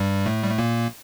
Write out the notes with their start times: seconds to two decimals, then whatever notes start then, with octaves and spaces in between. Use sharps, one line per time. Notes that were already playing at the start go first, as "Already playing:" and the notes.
Already playing: G2 G3
0.26 A2 A3
0.43 G3
0.50 A3
0.59 A#2 A#3